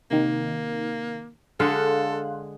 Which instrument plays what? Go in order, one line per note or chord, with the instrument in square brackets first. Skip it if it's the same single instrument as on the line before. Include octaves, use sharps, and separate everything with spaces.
[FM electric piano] C3 D#3 [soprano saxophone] A#3
[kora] D3 G#3 [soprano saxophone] A4 [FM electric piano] F5 C6 F#6